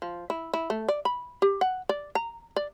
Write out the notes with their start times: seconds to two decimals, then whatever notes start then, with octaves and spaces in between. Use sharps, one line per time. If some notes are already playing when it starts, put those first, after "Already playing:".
0.02 F3
0.30 E4
0.54 E4
0.70 A3
0.89 D5
1.05 B5
1.42 G4
1.61 F#5
1.89 D5
2.15 A#5
2.56 D5